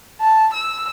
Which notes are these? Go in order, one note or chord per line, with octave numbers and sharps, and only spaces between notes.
A5
E6